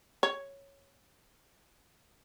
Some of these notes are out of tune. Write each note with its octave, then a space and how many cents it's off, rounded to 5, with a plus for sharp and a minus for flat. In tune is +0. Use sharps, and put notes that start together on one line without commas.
C#5 +0